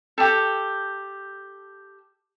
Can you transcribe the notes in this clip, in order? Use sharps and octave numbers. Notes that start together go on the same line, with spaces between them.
G4 A4